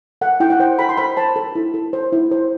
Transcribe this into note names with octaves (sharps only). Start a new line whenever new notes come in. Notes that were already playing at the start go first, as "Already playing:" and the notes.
A4 F#5
E4 G5
F#5
C5 G5
A4 B5
C6
C5 B5
C5 A5
A4
E4
A4
C5
E4
C5